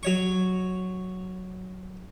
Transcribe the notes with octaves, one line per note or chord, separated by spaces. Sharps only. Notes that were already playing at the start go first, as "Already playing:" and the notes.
F#3 C#5 C#6